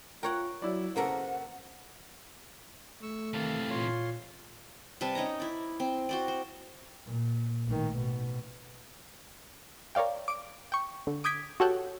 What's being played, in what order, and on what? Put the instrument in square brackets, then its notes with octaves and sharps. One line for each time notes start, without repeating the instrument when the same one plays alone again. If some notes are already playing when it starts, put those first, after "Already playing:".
[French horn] F4 [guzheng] A#4 C#5 F#5 [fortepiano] G5
[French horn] F#3 [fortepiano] E4 D5
[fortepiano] C#3 A4 [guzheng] A#3 B3 A#4 [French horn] C5 [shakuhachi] F#5
[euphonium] A3 [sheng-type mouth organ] C#6 E6
[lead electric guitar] C3 E3 [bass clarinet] D#3 [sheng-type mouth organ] F5 A5
[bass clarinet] A#2 [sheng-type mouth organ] F4 C#5 C6
[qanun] C3 G3 B4 A5
C#4 D#4 C#5 A#5
E4 D5
C4
F#4 C5 D5
C5
[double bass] A#2
A1 D#3
B2
[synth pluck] A#4 C#5 D5 F5 G5
D6 D7
G5 C#6
D3
D6 D#6 G6 G#6 B6 D7
F#4 G4 A4 C#5 F#5 G5